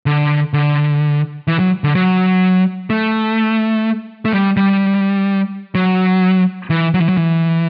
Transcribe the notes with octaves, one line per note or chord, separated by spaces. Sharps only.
D3
D3
E3
F#3
D3
F#3
A3
A3
G3
G3
F#3
E3
F#3
E3
F#3
E3